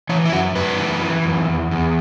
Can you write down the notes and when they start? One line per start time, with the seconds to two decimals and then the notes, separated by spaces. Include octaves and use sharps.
0.09 E3 C#5
0.26 E4
0.33 F#2 F#4
0.55 F#2 B4
0.78 E3
1.02 E3
1.25 F#2
1.48 E2
1.71 E2